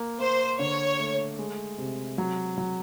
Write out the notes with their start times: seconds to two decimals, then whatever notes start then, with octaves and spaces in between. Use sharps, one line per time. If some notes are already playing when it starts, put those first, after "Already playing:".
Already playing: A#3
0.19 A#3 C5
0.59 D3 C#5
0.99 A3
1.39 G#3
1.78 C3
2.18 F#3
2.58 F#3